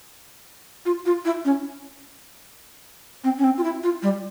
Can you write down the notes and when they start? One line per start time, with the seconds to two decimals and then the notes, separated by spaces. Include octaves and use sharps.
0.86 F4
1.06 F4
1.25 E4
1.45 C#4
3.24 C4
3.38 C#4
3.44 C4
3.58 F4
3.64 E4
3.83 F4
4.03 G3